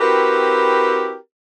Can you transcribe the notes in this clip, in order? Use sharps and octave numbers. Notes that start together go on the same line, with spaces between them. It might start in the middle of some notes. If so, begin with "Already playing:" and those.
C4 E4 F#4 G4 A#4 B4